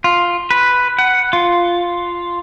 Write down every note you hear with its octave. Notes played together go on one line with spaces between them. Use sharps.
F4
B4
F#5
F4